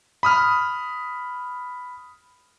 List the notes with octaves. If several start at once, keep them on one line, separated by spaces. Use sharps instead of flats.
B5 D#6 F6